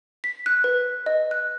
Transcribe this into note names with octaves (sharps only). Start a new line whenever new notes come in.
B6
F#6
B4
D#5
F#6